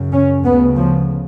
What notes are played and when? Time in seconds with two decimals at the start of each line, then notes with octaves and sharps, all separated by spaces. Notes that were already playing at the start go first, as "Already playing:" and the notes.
Already playing: F#2 C#3
0.12 C#4
0.44 D2 C#3 B3
0.77 F3